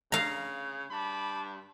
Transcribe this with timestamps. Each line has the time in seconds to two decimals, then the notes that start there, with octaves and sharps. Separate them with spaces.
0.12 C#3 F5 A#5
0.91 G2 A5 B5 D6